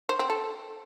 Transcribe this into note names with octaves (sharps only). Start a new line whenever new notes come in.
C5
C4
A4